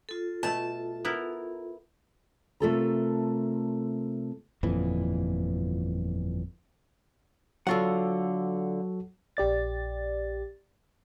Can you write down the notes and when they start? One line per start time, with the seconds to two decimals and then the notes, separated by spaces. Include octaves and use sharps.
0.09 F4 A4
0.43 B2 A3 A5
1.05 B3 E4 A#4
2.60 C3 A3 F4 A4 A#4 A#5
4.63 G1 F2 A#2 E3
7.67 D3 F#3 F4 F#4 A4 F#5
9.37 A#1 G4 D5 A6